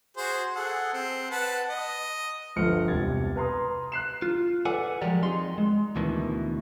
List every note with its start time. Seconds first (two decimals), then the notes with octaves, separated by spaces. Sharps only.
0.17 F#4 G#4 C5
0.55 G#4 A4 F#5
0.93 C4
1.30 B4 F#5 A5
1.68 D#5
2.56 G1 F3 F6 C#7
2.88 E1 C2 G4 G#6 A6
3.36 B4 A#5 C6 D#6
3.92 F#6 C7 E7
4.22 F4
4.65 A4 B4 D5 F#5 G#5
5.01 F3 F#3 G#3 G4 A#4 D5
5.22 F2 D#4 G#4 C6
5.58 G#3
5.96 D2 B2 D#3 E3